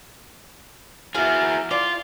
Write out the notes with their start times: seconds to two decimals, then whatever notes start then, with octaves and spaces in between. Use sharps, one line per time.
1.15 E4 F#4 G#4 A#4 F5
1.71 F4 D5